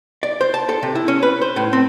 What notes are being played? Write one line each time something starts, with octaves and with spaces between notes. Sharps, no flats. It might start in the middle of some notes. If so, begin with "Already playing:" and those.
D5
C5
A5
A4
C3
E4
C#4
B4
C5
A2
C4